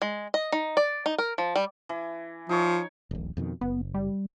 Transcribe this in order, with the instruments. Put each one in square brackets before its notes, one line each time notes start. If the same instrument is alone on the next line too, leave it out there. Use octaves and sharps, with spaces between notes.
[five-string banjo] G#3
D#5
D#4
D5
D#4
A#4
F3
G3
[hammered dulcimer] E3
[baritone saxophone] F3 [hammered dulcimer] D#4 C#5
[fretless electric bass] D#1 A#1
F2 B2 D#3
[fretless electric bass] F#1 [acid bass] B3
[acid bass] G3